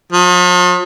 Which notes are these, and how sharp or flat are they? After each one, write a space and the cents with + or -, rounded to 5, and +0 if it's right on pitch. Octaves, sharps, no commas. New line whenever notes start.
F3 +45